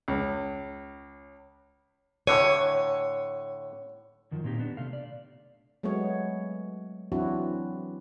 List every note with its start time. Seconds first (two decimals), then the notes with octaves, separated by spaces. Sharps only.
0.08 C#2
2.27 A2 D3 C#5 G#5
4.31 F#2 D#3 F3
4.44 A#2 C4 D#4 G4
4.59 B3 D4
4.77 C3 A3 F5
4.93 D5
5.83 F#3 G#3 A3 B3 C#5
7.12 E3 F#3 C4 D4 E4 F#4